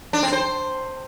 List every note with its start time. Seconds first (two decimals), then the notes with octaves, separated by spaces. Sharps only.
0.13 D4
0.23 C4
0.32 C5